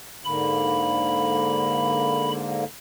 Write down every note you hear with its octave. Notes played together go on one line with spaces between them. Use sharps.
G#2 D3 A#3 B5